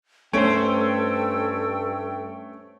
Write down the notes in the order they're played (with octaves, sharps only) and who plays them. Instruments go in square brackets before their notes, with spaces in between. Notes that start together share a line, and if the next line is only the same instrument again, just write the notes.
[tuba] G2 [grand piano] A3 C#5 D7 [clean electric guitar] C#4 C5 [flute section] A4 G5